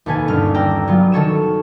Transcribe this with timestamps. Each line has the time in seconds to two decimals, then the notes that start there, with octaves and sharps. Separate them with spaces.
0.06 D#2 B2 A4 B4 G#5
0.28 G1 C#4 F6
0.54 D5 G5 A#5 E6
0.87 F#3 B3 F4
1.12 D#3 A4 C#5 E7